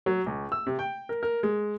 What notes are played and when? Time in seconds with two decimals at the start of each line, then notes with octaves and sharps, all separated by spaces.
0.06 F#3
0.26 C#2
0.52 E6
0.67 C3
0.79 G5
1.09 A#4
1.23 A#4
1.43 G#3